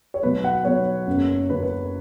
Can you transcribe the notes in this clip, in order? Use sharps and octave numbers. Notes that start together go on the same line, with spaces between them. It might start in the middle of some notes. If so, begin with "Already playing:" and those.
C#5
B1 B2 F#3 B3 B4
F#5
B1 B2 F#3 B3 C#5
F#1 F#2 C#3 B3
F#1 F#2 C#3 B3 B4
B4